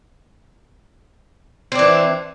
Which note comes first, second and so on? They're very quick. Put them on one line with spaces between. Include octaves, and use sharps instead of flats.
C4 D4 E3